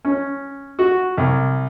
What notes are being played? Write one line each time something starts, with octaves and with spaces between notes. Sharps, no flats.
C#4
F#4
C2